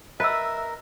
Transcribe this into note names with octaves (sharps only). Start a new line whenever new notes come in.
A#4 B4 D#5 E5 E6